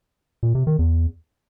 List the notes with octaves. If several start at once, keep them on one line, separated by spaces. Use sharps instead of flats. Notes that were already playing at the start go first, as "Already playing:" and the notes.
A#2
C3
D#3
E2